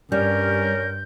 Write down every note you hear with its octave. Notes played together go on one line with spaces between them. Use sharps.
G2 G3 C#4 A#4 G6